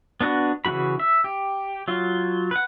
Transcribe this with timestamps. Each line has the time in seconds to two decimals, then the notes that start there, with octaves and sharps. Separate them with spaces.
0.21 B3 D4 F#4 B4
0.65 C#3 E3 A3 F#4 B5
1.00 E5
1.24 G4
1.88 F#3 F4
2.51 B4 F#5